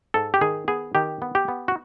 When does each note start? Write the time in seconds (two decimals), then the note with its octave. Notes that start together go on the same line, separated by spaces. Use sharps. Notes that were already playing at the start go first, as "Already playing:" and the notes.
0.14 G#2 A4
0.34 G4
0.41 D#3 G#4
0.68 B3 G#4
0.95 D#3 G4
1.22 B3
1.35 G4
1.48 B3
1.68 F#4